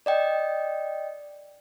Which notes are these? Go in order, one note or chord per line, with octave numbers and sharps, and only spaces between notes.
D5 D#5 G5